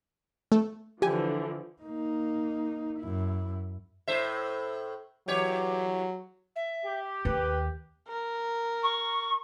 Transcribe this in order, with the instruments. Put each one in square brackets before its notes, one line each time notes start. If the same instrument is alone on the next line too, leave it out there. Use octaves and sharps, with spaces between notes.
[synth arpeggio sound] A3
[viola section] D3 E3 F3 [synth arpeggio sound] G4 G#5
[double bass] A#3 D#4
F#2 E4
[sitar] A2 C5 E5
[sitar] E2 G4 C#5 [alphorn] F#3
[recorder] E5
[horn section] G4
[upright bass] D#2 [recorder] B4
[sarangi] A#4
[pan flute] C#6